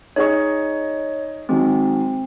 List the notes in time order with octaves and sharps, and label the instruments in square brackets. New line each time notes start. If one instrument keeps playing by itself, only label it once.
[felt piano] D#4 G#4 D#5 [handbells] C#5 C#6
[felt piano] D#3 F#3 G#3 [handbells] C4